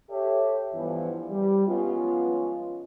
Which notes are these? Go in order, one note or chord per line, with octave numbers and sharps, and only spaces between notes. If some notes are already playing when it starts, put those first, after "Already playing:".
G4 A4 C#5 E5
G2 E3 F3 B3
G3
F3 G#3 B3 C#4 F4